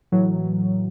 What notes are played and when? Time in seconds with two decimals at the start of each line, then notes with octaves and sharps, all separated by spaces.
0.12 A2 E3 F#3